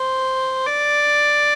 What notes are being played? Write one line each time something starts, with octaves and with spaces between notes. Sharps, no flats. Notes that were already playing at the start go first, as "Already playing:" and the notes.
Already playing: C5
D5